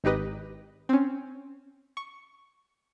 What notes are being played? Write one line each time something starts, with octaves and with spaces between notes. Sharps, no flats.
G#1 D#4 G4 B4 D#5
C4 C#4
C#6